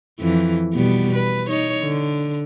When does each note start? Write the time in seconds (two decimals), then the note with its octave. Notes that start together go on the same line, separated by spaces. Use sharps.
0.20 F2 E3
0.74 B2 G3 B3
1.15 B4
1.48 D#4 C#5
1.81 D3